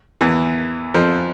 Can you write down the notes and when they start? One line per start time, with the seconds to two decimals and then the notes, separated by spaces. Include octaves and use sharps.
0.21 E2 E3
0.94 F2 F3